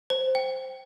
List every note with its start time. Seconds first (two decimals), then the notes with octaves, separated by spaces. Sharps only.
0.10 C5
0.35 G5